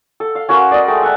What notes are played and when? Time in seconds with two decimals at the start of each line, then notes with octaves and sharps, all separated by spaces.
0.20 A4
0.35 F5
0.49 C#4 F#4 A#4 C5
0.71 D5 D#5
0.87 G#3 A3 G5
1.02 E5 F#5 A5